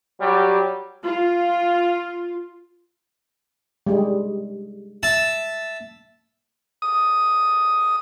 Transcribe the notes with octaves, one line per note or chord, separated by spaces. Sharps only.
F#3 G3 G4
F4
G3 G#3
E5 A5
D#6